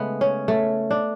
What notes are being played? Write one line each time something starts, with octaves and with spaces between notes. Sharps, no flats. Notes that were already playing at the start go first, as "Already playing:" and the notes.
Already playing: C#3 G#3 A3 B3
C#4
A3
D4